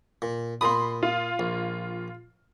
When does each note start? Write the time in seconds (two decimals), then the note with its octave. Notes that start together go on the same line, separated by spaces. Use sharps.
0.22 A#2
0.61 A#2 B5 C6 D#6
1.03 F4
1.39 A#1